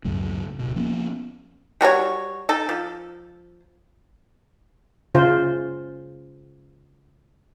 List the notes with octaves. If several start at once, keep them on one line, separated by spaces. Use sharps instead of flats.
C#2 F#2 A2 C#3
D1 B2
F3 A#3 B3 C#4
G3 F#4 A#4 C#5
D#4 A4
F3
C#3 F4 C5